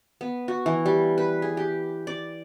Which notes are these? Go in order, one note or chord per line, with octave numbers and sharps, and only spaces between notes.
B3
F#4
E3
G3
B4
G#4
G4
D5